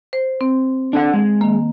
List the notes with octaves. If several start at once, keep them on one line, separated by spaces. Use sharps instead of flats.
C5
C4
D4 A4 F#5
G#3
D#3 A#3